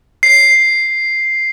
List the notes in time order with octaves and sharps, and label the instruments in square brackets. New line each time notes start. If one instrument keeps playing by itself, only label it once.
[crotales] C7